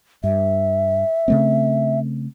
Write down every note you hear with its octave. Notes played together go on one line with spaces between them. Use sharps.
G2 E5
C#3 A3 C4